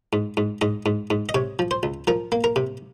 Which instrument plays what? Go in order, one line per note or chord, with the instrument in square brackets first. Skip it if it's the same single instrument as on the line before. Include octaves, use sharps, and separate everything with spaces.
[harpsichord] G#2
G#2
G#2 D#5
G#2
G#2
D#5
C3 C#5
F3
C5
C#2
F3 A#4
A#3
A#4
C3